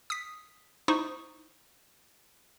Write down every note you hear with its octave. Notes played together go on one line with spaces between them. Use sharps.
D#6 B6
D#4 E4 C5 B5 C#6 D#6